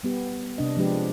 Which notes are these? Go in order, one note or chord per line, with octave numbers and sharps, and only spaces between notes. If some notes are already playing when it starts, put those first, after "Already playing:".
G3 B3 G4
C3 D4 D#5
F3 G#3 D4 G4 B4